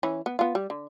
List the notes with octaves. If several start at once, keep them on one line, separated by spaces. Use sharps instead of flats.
E3 C#4
B3
B3 F4
G3
D3